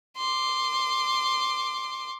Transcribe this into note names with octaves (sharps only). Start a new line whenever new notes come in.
C6 D6